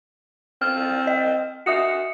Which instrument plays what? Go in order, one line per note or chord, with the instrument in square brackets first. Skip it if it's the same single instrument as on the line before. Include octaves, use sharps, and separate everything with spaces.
[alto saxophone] C4 [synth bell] F6
[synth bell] D#5
[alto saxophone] F#4 [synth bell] E5 D#6 C#7